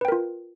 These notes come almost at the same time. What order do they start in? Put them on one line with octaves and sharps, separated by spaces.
B4 G5 A#4 F4